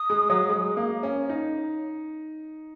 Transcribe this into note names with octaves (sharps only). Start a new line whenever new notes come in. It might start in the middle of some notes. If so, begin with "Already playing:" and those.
Already playing: D#6
G#3
F#3
G#3
A#3
C#4
D#4